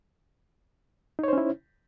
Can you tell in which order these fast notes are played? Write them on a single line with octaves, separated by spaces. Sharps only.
D#4 C#5 C5 C#4 E4